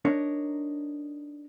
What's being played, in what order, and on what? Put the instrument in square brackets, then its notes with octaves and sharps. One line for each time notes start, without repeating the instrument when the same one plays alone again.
[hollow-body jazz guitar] D4 D#4 A#4 C#5